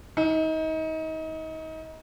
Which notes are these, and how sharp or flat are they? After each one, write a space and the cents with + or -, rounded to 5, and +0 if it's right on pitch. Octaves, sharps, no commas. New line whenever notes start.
D#4 +30